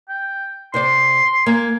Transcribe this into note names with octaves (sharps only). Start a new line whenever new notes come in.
G5
C3 C5 D5 C6
A#3 G#5